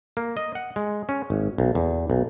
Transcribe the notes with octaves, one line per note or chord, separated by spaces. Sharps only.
A#3
D#5
F#5
G#3
C#4
G#1
B1
E2
B1